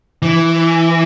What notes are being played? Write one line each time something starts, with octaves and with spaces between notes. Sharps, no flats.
E3